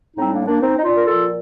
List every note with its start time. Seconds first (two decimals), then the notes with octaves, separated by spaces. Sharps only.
0.16 A2 G3 C4 D#4
0.32 A#3 D4
0.46 A#3 D4
0.60 C4 D#4
0.76 D#4
0.83 D4 F4
0.95 A#4
1.05 A#2 F3 F4 A4